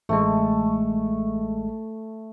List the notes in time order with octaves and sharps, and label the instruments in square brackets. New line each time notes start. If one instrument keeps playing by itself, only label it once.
[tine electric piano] A1 G#3 [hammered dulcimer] A3 A5 C#6